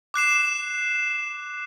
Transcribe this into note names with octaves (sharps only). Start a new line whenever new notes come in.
D6 F#6 C7 E7